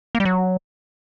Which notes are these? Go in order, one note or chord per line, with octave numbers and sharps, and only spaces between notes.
A#3
G3
F#3